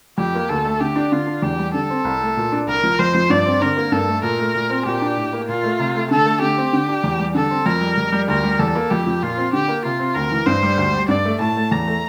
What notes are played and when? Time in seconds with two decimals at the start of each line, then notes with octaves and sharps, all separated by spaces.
0.18 F2 G4
0.35 A#3
0.49 D2 A4
0.64 A3
0.80 D3 G4
0.96 D4
1.12 D3 F4
1.27 D4
1.42 E2 G4
1.58 G3
1.74 D3 A4
1.90 C4
2.05 C2
2.21 A3
2.37 A#2
2.52 D4
2.67 C2 A#4
2.83 F3
2.99 F2 C5
3.15 F3
3.30 G2 D5
3.45 C4
3.62 D3 A#4
3.77 A#3
3.92 G2 A4
4.08 A3
4.23 A#2 A#4
4.39 A3
4.55 A#2
4.70 C4
4.86 A#2 G4
5.02 D4
5.17 A2
5.33 A#3
5.48 A#2 F4
5.63 A3
5.79 C3
5.94 A3
6.10 D3 A4
6.25 A3
6.41 D3 G4
6.58 C4
6.73 D3
6.88 D4
7.04 E2
7.19 G3
7.34 D3 A4
7.51 C4
7.66 F2 A#4
7.81 G3
7.98 F2
8.12 G3
8.28 D2 A#4
8.43 G3
8.59 E2 A4
8.75 A#3
8.90 F2 G4
9.07 F3
9.22 A#2 F4
9.37 C4
9.53 D3 G4
9.68 A#3
9.84 C3 F4
9.99 C4
10.15 D2 A#4
10.32 E3
10.46 G2 C5
10.63 G3
10.77 D2
10.93 G3
11.08 G2 D5
11.25 A3
11.40 A2 A5
11.56 A3
11.71 E2 A#5
11.87 A3